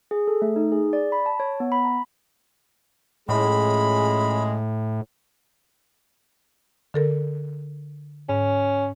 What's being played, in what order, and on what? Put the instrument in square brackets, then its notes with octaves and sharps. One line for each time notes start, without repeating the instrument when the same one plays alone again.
[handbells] G#4
A4
A3
D#4
G#4
D5
B5
A5
C#5
B3
B5
A#5
[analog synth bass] A2 [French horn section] F3 C#4 G#4 [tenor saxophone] G#3 [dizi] B5
[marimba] D3 A4 A#4
[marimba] G#2 [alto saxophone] C#4